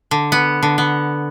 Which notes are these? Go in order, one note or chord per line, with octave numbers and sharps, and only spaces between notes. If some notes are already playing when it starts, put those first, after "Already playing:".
D3
B3
D3
B3